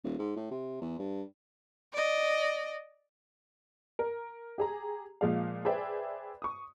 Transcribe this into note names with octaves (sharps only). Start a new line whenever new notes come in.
D#1
G#2
A2
C3
E2
G2
D5 D#5
A#4
G4 G#4 A#5
A#2 F3 G#3 F5
G#4 B4 C5 D5 E5 G5
C#6 D#6